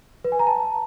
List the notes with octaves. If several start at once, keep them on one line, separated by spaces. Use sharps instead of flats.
B4
G#5
A#5
A5